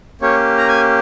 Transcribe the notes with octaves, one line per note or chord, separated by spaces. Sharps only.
A#3 C#4 G4 C#5
A#5
G#5